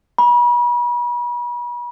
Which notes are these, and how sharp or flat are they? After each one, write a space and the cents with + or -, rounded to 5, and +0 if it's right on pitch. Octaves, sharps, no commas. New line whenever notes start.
B5 -40